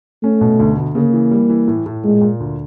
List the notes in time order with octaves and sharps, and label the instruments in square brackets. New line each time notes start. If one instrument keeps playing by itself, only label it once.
[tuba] A3 [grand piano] C#4
[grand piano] B2
D2
D2
[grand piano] C#3 [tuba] A#3
[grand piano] E3
G3
E3
A2
A2
[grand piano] A#2 [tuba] G#3
[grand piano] A#2
D2